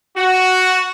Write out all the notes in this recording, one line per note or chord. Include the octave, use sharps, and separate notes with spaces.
F#4